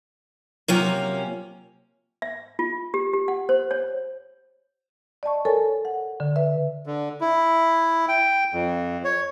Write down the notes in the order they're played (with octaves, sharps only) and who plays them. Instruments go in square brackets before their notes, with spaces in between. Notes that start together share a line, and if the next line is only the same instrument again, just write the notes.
[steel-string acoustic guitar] C3 A#3 C#4 [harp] F#3 F4 G5
[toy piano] E5
F4
G4
G4
F#5
C5
C#5
[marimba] D5 D#5 A5 C#6
A4 A#4 C#5 G#5 A5
F#5
D3
B4 E5
[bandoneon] D3
E4
G5
F2
C#5